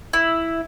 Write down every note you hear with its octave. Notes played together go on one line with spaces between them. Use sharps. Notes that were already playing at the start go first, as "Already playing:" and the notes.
E4